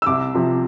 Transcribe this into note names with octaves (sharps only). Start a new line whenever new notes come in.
E6
C2 D6
C3 F3